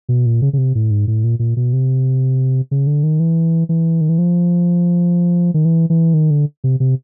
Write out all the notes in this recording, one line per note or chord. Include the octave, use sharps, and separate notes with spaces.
B2
A#2
C#3
C#3
C3
A2
G#2
A2
A#2
A#2
B2
C3
C#3
D3
D#3
E3
E3
D#3
E3
F3
D#3
E3
E3
D#3
D3
C3
C3